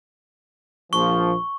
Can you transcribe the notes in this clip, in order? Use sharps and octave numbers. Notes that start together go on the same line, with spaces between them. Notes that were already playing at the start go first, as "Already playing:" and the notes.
A#1 F3 C#6